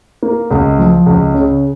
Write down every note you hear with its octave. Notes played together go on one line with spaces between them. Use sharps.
A#3
C#2
F3
C#2
C#3